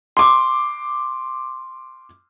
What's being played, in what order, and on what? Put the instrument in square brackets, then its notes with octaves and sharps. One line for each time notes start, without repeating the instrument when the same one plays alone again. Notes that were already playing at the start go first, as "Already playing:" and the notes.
[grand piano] C6 D6